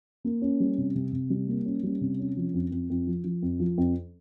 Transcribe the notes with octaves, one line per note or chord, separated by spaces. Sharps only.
A#3
C#4
G3
C3
C3
C3
G3
A#3
C#4
G3
C3
C#4
F3
F2
F2
F2
F3
F3
F2
F3
F2